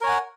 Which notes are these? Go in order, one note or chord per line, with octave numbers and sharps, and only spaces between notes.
A#4 C#5 F#5 G#5